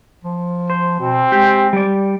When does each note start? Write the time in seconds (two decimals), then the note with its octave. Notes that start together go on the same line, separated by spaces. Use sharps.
0.25 F3
0.70 C5
1.00 B2 C4
1.32 G#3 G4
1.73 G3 D5